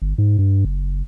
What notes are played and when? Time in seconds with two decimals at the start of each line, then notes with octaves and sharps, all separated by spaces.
0.02 G1
0.18 G#2
0.39 G2
0.65 F#1